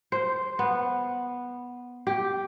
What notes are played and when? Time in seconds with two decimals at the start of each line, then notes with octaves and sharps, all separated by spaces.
0.12 C5
0.59 B3
2.07 G4